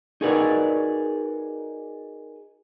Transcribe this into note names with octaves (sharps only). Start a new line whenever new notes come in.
D#4 F#4 G#4 A#4 B4 D5